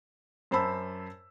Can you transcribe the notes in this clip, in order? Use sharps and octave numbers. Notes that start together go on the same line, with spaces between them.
F#2 C5 A5 B5 E6